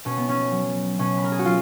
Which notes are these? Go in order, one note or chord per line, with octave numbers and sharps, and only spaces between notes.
B2 C#4
B3
C#4
F#3
B2 C#4
B4
A#4
G#4
F#4
F#3 F4